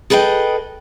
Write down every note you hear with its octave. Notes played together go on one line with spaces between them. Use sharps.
G#4 A4 B4 D#5 G5